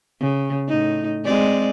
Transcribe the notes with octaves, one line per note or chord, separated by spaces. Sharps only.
C#3
A2 D#4
G#3 C4 D5